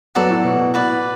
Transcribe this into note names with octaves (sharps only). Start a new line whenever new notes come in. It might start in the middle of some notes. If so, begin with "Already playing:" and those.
F#3 B3 F#4 A4 D5
A2
B2
B2
A2 F#4 B4 D5